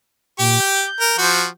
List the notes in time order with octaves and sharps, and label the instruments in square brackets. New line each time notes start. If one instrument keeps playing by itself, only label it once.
[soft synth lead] A#2 [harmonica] G4 D6
[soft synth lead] G6
[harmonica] A#4
F3 F#4